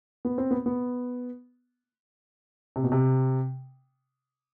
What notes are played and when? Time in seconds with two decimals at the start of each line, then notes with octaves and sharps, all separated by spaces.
0.25 B3
0.38 C4
0.51 B3
0.66 B3
2.76 C3
2.84 B2
2.92 C3